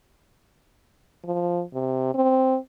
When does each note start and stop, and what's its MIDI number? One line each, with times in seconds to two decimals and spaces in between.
1.25 1.63 53
1.74 2.13 48
2.14 2.57 60